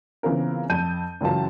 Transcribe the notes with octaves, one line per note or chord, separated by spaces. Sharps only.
C#3 E3 B3 C4 F4 A#4
F2 A5 G6 D#7
C#2 F#2 E3 F4 A5